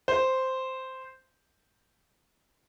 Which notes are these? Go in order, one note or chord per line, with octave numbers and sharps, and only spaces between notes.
C5